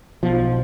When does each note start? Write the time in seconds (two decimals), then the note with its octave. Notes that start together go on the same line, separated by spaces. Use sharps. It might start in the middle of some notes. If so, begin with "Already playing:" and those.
0.23 B1 B2 F3